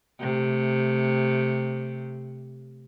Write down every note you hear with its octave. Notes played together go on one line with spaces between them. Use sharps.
C3 A3